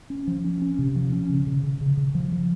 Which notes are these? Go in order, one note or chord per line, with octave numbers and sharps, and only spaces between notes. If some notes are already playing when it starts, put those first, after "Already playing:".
C#4
F3
C#4
C#4
C3
F3
C#4
C#3
C#3
C#3
C#3
C#3
F3
F3